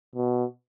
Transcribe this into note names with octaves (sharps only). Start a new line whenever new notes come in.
B2